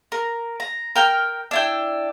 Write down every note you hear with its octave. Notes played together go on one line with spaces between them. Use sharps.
A#4
A#5
A#4 G5 F6
D4 E4 G5